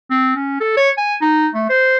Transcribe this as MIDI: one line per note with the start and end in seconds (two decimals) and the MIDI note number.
0.11 0.32 60
0.36 0.57 61
0.61 0.76 69
0.77 0.90 73
0.98 1.15 80
1.22 1.47 63
1.55 1.68 57
1.70 1.98 72